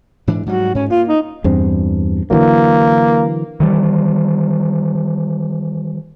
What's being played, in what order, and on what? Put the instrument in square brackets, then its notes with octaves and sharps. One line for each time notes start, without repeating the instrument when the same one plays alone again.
[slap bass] G#2 E3 D4
[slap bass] G#2 F#3 G3 [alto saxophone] F#4
[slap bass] G#2 [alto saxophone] C#4
[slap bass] A#3 [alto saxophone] F4
[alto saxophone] D#4
[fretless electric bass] E2 G2 C4
[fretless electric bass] D3 E3 F#3 [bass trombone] A#3
[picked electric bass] D#3 E3 G3